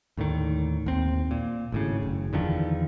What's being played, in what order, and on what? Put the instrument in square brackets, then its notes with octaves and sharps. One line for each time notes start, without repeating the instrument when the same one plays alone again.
[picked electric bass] D#2 A2 D3 D#3
D#2 C4
A#2
G#1 A2 C#3
F#1
E2 D3 D#3 F3